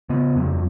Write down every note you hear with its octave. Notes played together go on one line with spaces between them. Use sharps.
C#3 B3
F2 F#3